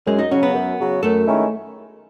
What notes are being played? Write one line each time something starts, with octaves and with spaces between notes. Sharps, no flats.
F#2 G#3 G#4
D#4 D#5
C#3 F#3 C#4 C#5
B3 B4
F#2
C#3 F#3
F#2 A3 A4
D#3 G#3 C#4 E4